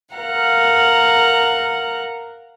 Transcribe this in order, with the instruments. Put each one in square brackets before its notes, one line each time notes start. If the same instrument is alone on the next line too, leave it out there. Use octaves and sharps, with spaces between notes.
[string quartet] A#4 F5 F#5 A#5